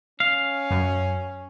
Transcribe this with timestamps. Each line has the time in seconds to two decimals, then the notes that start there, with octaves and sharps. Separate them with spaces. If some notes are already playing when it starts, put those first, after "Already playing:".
0.20 C#4 F5
0.71 F#2